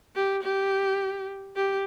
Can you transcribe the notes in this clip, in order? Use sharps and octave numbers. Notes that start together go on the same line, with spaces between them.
G4
G4
G4